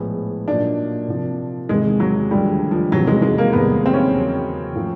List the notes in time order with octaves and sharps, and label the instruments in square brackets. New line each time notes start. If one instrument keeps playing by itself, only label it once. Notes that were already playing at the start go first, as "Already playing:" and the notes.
Already playing: [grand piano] A#1 A2 F3 G#3 B3
[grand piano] A#2 F#3 A#3 D#4 [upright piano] D4
[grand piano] C3 F3 A#3
[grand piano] E2 C3 D#3 [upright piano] G#3
[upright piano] F#3
[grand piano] D#2 D3 F3 A3 [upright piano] G3
[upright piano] F3
[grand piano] F1 E2 C3 E3 A3 [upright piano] F#3
[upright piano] G#3
G#3
A#3
[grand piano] F1 E2 C3 D#3 G3 [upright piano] B3
[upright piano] C4
C#4
[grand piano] E2 C#3 F#3
C#3 F3 A3